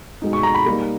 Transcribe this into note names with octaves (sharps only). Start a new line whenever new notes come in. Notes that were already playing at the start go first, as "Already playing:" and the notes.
B2 G#3 D#4
C#6
A#5
B5
G3 A#3 D#4